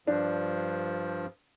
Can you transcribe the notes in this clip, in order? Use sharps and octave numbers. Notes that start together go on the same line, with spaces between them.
G2 F3 D4